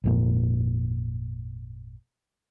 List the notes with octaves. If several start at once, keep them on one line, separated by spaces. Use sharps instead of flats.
G#1 F2 A#2